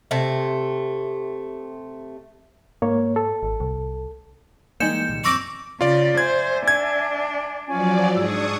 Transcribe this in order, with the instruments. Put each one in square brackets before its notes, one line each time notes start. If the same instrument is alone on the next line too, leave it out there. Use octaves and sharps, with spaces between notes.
[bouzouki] C3 A3
[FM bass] G#2 [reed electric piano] A#3 C#5
[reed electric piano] A4
[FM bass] G#1
C2
[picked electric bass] E3 A#3 [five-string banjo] G3 G#3 D#4 [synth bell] G6 C#7 E7
[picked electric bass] C2 A#2 D#3
[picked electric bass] F#2 F3 C4 [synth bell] C#6 E6 A#6 [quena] D6
[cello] C#3 [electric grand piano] F4 D5
[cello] C5 [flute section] D5 E5 G#5 [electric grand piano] G#6
[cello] D4 [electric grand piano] G#6
[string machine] F3 F#3 D5 [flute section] C#4 F4 G#5
[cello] G#2 [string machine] D4 C#6 D#6 [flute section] G#4 E6